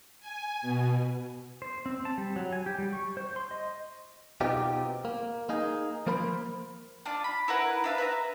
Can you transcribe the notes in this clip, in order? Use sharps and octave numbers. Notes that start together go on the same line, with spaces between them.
G#5
B2
C5
C4
A5
G3
F#3
G#5
G4
G3
C#6
C5
C6
D#5
B2 B3 C4 D#4 F4 G4
A#3
A#3 D#4 G#4
F3 A#3 A#4 C5 B5
D4 F4 D5
B5
E4 A#4 B4 F#5
D4 B4 E5 F5
B4 E5 A#5